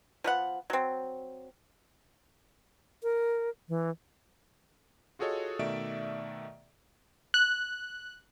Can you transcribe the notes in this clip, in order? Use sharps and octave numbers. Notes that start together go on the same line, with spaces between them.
F3 B3 F#5
F#3 C4
A#4
E3
F4 F#4 G#4 A4 C#5 D#5
B2 D#3 A3 D5 E5 D7
F#6